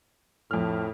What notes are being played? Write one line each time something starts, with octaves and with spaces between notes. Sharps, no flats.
F2 A2 F6